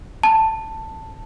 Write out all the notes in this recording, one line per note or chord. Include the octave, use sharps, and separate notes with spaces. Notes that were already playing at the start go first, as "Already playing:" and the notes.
A5